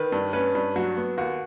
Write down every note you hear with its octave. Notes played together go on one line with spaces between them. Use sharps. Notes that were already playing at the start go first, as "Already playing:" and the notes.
Already playing: D#3 B4
G2
C#4 B4
G2
F#3 F#4
B3
D#2 F#4